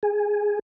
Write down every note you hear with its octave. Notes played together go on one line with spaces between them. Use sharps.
G#4